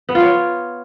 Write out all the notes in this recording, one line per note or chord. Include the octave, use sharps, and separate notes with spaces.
B3
F4
C#5